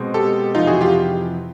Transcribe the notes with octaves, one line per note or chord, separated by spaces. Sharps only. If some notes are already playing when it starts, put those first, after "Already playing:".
Already playing: B2 G#3 C4
G4 A4
F2 C3 E3 D#4 F4
F#4 G#4
F4 G4